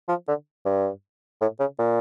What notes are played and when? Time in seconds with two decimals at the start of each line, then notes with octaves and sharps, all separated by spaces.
0.08 F3
0.28 D3
0.65 G2
1.41 A2
1.60 C#3
1.79 A#2